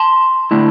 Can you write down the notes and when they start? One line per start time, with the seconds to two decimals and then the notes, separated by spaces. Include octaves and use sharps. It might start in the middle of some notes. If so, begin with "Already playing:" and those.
Already playing: A5 C6
0.51 D3 A3 E4